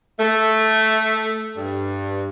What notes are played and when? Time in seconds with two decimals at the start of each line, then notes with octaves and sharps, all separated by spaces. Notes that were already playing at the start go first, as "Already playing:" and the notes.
0.19 A3
1.57 G2